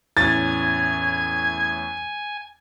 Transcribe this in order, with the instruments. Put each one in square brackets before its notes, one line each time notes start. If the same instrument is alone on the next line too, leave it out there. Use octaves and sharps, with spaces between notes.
[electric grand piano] E2 A2 C#4 [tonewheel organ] G#5 [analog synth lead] G#6 [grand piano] A6